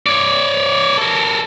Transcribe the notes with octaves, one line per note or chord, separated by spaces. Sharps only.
C#5 D5
A4 A#4